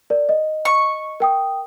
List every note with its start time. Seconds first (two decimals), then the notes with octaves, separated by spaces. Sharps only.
0.10 A#4 D5
0.29 D#5
0.65 C#6
1.20 A#4 G5 D#6